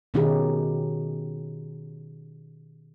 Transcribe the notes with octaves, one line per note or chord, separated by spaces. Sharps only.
B2 D#3 C#4 D#4 G4 G#4